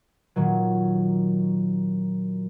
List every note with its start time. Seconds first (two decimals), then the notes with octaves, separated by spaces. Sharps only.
0.36 A#2 D#3 F#3